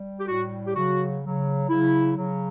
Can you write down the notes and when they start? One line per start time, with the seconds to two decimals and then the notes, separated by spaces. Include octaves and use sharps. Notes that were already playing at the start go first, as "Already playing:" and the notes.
Already playing: G3
0.19 G4
0.28 A2 G3 F#4
0.67 G4
0.75 C#3 F#3 F#4
1.22 C#3 F#3
1.69 C#3 F#3 E4
2.17 C#3 F#3